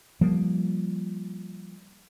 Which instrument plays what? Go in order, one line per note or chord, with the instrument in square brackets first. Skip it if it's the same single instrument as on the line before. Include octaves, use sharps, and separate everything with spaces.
[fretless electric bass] F3 G3 A#3